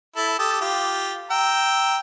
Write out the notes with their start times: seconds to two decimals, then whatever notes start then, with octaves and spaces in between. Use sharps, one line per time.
0.17 E4 A4
0.39 G4 A4 D#6
0.61 F4 G4
1.31 G5 A#5 E6